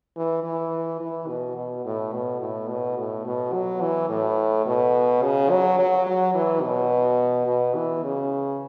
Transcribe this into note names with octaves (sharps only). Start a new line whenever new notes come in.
E3
E3
E3
B2
B2
A2
B2
A2
B2
A2
B2
F#3
E3
A2
B2
C#3
F#3
F#3
F#3
E3
B2
B2
E3
C#3